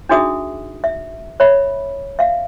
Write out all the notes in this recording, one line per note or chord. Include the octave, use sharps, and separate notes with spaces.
D4 D#4 F#4 G#4 E5 D#6
E5
C#5 E5 B5
E5 F5